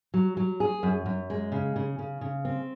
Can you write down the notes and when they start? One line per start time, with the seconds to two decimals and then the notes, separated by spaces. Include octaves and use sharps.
0.14 F#3
0.37 F#3
0.60 G#4
0.83 F#2
1.06 F#2
1.30 G#3
1.52 C#3
1.76 C#3
1.99 C#3
2.21 C#3
2.45 C4